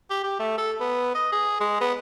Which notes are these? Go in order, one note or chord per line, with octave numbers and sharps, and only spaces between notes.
G4
G4
A3
A4
B3
D#5
G#4
G#3
B3